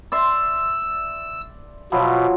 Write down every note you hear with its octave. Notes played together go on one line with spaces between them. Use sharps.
D5 E5 C6 E6
B2 F3 F#3 E4